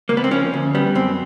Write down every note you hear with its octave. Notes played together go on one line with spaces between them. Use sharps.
C#2 A#3
B3
C4
F3 C#4
D2
G3 B3
F#2 C4